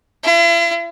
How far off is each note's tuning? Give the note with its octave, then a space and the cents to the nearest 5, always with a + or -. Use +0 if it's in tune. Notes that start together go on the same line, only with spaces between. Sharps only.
E4 +45